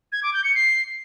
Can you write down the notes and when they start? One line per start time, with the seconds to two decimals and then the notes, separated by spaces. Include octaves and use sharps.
0.12 G#6
0.23 D6
0.33 G6
0.44 C#7
0.55 C7